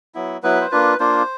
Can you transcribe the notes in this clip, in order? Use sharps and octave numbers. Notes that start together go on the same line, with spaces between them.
F#3 B3 E4
F#3 B3 E4 B4
C5
A#3 D4 F4 B4
A#3 D4 F4 C5